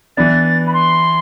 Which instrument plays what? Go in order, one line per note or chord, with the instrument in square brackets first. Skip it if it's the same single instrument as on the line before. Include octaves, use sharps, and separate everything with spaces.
[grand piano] E3 B3 D4 [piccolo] A6
[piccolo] B5
C6